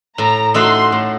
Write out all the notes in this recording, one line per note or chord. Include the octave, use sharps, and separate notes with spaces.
A2 A#5
A3 D#4 F#4 A4 C6
A2